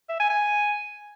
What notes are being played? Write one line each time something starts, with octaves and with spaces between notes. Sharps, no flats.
E5
G#5
G#5